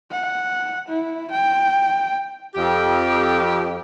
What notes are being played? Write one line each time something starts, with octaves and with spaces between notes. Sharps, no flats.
F#5
E4
G5
F2 G4